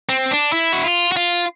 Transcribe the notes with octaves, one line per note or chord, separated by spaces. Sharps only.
C4
D4
E4
F#4
F4
F#4
F4